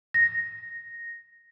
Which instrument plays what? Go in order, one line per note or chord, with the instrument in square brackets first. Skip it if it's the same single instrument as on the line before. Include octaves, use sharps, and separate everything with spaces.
[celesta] A#6